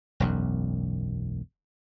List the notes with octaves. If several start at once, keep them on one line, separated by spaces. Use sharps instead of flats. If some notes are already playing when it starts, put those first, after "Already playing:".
E1 B1 F#2